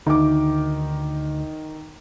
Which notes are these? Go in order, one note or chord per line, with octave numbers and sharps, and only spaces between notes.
D2 D#3 D6